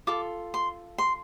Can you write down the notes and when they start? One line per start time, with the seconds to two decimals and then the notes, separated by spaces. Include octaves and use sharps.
0.07 F4 A4 D6
0.54 C6
0.98 C6